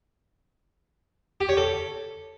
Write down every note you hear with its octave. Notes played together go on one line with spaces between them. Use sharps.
G4
C#5
A4